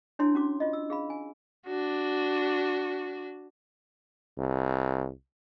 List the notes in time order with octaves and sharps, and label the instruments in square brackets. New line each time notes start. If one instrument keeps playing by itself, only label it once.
[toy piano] D4 E4 C#5 C6
C#4 F#4 D6
F4 D#5
E6
G#4 F5 B5
G#5
[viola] D4 F#4
[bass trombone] C2